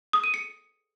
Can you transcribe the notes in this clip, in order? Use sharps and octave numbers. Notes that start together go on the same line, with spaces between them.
D#6
D#7
C#7